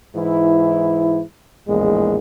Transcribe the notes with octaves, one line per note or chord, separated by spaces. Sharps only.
G#2 E3 E4
A#1 E2 A2 G#3